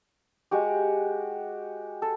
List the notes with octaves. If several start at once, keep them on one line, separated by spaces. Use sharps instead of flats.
G#3 F#4 G4
A4